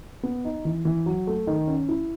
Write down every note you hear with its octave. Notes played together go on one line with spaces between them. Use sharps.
B3
D#4
E3
E3
F#3
A3
D#3
C#4
E4